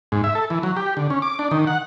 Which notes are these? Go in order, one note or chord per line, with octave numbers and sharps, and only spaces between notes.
G#2
E5
A4
E3
F#3
G4
D3
C#4
D6
D4
D#3
F#5